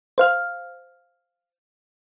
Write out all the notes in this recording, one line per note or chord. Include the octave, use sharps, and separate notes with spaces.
C5 F5 F6